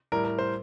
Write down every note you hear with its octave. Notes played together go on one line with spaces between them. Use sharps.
A2 G3 A#4
A#4
C5